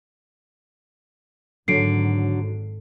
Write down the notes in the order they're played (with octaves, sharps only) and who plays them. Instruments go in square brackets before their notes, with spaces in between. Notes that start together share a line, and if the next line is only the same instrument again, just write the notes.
[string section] G#1 [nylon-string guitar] D3 [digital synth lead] F#3 [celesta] C7 D7